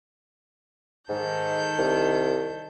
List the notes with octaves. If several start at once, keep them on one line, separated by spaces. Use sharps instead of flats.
G#2 D#3 A4 G6
C2